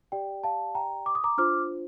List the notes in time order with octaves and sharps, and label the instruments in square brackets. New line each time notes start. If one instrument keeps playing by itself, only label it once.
[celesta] G4 D5 G5
F5 A5
G5 A#5
D6
D#6
A#5 D6
D4 F4 C5 D6 F6